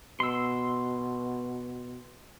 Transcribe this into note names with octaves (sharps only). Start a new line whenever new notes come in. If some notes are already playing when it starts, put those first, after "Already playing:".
B2 C6 E6